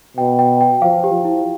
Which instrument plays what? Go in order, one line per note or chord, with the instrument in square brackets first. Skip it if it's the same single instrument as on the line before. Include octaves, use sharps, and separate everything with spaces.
[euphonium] B2 [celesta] G5
[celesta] G5
G5
[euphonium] F3 [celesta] F5
[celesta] G4
[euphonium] F3
[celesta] E4